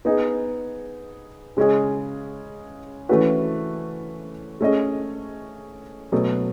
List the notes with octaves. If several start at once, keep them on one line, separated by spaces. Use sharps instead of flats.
B3 D#4 G#4
C#3 G#3 C#4 G#4
E3 A3 C#4 F#4 B4
A3 C#4 G#4 D#5
B2 F#3 A3